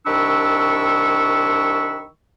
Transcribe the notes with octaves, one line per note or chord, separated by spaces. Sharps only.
C2 D#3 D4 B5 C#6 E6